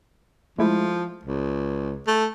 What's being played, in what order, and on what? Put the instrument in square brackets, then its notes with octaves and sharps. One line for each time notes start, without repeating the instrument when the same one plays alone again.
[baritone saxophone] F3 [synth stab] G#3 A3 E4
[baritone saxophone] C#2
A3